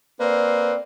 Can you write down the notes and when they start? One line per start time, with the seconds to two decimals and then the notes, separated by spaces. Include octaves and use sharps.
0.20 A#3 C4 B4 D5